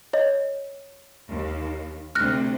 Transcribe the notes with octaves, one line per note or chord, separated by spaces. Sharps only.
C#5 D#5
D#2
D2 C3 F6 F#6 A#6